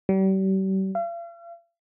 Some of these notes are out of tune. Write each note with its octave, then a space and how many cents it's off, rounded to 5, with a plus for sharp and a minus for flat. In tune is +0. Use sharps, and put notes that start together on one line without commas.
G3 -40
F5 -45